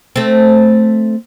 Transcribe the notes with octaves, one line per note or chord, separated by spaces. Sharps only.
A3 C4